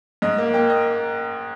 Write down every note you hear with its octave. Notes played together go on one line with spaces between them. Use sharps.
G#2 D#5
A#3
A#3 G5
D#5